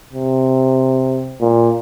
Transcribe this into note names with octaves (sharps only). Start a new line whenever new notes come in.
C3
A#2